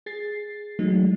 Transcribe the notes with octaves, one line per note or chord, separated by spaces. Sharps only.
G#4 A6 C7
E3 F#3 G#3 A3 D#4